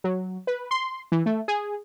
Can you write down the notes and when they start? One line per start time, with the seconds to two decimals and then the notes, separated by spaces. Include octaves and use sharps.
0.04 F#3
0.47 B4
0.71 C6
1.12 E3
1.26 A3
1.48 G#4